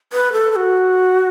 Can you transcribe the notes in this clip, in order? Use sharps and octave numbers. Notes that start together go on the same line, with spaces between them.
B4
A4
A4
F#4